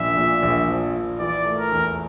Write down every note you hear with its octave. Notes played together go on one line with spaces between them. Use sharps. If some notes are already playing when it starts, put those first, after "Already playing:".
Already playing: A#1 F3 E5
A#2
A#1
F3
A#1
E3 D5
A3
A#4
E2